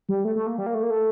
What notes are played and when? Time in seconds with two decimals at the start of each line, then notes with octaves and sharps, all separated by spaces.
0.09 G3
0.25 A3
0.36 A3
0.47 A#3
0.58 G3
0.66 A#3
0.74 A3
0.83 A#3
0.90 A3